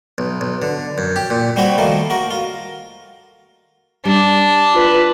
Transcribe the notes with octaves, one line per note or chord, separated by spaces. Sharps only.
B1
B1
D3
F#2
G4
A#2
G3 C4 F#4 B4 C#5
D#3 F3 A3 A#3
F#4 A#4
F4
G3 D4
F4 B4